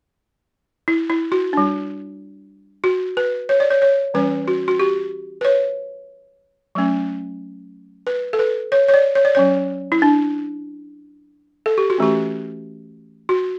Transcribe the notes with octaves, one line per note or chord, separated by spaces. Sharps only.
E4
E4
F#4
G3 D4
F#4
B4
C#5
D5
C#5
C#5
E3 G3 C#4 B4
F#4
F#4
G4
B4
C#5
F#3 A3 C#4
B4
A4
B4
C#5
C#5
D5
C#5
D5
F#3 C#4 C#5
E4
D4
A4
G4
F#4
E3 A3 C#4 G4
F#4